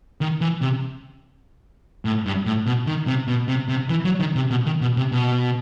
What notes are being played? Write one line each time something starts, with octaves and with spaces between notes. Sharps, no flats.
D#3
E3
C3
A2
G2
A2
B2
D#3
C3
B2
C3
C3
E3
F#3
D#3
C3
B2
D#3
B2
C3
B2